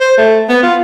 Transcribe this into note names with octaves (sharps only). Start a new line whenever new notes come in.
C5
A3
B3
F4